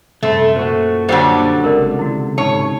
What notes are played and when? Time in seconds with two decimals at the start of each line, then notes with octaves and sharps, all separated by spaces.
0.23 C2 F#2 A3 C5
0.56 A#2 F#4 C5
1.09 D3 F#3 G3 C5 F#5 G5
1.64 F#1 C#2 C3 A#4 D5
1.99 D3 E4 F#4
2.38 G#2 D#4 C#5 A5